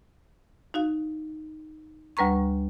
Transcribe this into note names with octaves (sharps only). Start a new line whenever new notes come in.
D#4 F#4 F5
D2 G3 B4 A#5 C#6